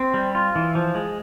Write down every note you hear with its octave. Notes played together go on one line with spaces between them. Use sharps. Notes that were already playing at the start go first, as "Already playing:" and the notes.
Already playing: C4
G3
F4
E3
F3
G#3